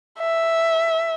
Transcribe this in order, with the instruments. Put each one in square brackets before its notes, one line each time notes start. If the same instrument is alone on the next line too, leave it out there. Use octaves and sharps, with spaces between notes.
[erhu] E5